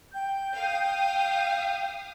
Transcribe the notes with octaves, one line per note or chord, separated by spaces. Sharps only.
G5 G6
F5 D#6